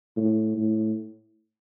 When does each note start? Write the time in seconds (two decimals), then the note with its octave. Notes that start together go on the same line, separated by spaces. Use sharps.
0.17 A2
0.57 A2